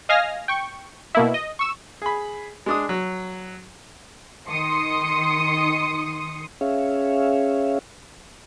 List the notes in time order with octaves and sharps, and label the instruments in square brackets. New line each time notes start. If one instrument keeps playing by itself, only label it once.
[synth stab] D#5 F5 G#5 F6 A#6
G5 C#6
B2 A#3 E4
D#5
C#6 E6 E7
[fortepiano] G#4 B5
G#3 D4 D#6
F#3
[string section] D#3 C6 D#6 C#7
[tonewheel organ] C#4 G#4 C#5 E5 F5